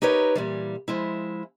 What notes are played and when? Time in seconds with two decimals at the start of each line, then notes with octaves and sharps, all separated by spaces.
0.02 D#4 G4 A#4 B4 C#5
0.35 A#2 E3 G3
0.88 F3 G#3 E4